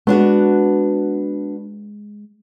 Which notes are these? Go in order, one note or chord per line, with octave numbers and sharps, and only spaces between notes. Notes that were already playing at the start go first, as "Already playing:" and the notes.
G#3 B3 D4 F#4